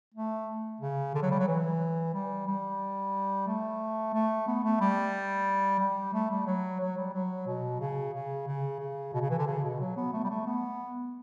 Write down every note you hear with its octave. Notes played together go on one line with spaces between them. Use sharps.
A3
C#3
D3
F#3
G3
F#3
E3
G3
G3
A3
A3
B3
A3
G3
G3
A3
G3
F#3
F#3
G3
F#3
B2
C#3
C#3
C#3
C#3
B2
C#3
E3
D3
C#3
B2
F#3
B3
A3
G3
A3
B3